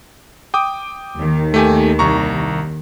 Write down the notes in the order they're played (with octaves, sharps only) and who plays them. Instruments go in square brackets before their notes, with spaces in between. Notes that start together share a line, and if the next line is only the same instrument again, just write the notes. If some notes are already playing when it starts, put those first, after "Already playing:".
[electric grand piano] G5 D6 D#6
[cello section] D#2 D#3
[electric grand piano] A3 G4 G#5
C2 A#5 C#6